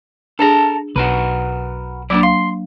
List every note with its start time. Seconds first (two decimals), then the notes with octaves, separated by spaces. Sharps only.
0.39 D4 G#4 A4 A5 A#5
0.96 B1 F#4 A#4 B4
2.10 F#3 A#3 D4 E4 D5
2.23 F5 C6